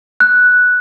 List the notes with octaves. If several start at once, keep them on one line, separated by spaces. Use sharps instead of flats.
F#6